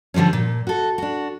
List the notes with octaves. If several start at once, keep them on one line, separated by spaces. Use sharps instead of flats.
D3 F3 G3 G#3 C#4
A#2
F#4 A4
D4 F#4